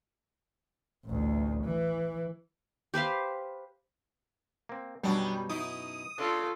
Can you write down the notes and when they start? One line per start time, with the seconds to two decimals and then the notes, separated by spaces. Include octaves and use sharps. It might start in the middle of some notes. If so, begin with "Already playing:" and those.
1.06 A1 D2
1.65 E3
2.94 G4 B4 C5 F5
4.69 A#3 C4
5.03 F#2 B2 F#3 G3 B3 D4
5.49 D#4 E4 D#6
6.18 C#3 D4 F4 A4